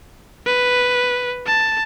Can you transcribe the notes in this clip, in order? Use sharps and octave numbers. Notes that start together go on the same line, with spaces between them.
B4
A5